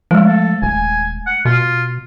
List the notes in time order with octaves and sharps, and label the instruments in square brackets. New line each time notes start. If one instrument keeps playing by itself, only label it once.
[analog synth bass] F3 [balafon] G#3 A3
[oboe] A4
[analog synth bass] D#1 [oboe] G#5
[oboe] F#5
[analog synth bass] B2 [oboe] F4